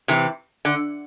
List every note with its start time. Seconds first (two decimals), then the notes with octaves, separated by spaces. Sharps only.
0.08 C3 E3
0.65 D3